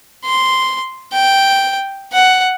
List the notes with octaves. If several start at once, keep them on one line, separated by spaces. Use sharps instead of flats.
C6
G5
F#5